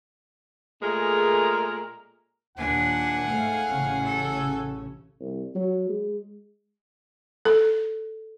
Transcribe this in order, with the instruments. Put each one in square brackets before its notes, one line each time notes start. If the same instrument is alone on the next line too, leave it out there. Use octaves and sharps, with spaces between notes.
[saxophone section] A#2 G#3 A3 G#4 A#4
[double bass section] D#2 A#2 [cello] D4 [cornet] F#5 [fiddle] G#5
[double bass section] G#2 A3 [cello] F5
[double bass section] A1 C#3 C#4
[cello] A4
[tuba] C2
F#3
G#3
[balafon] A4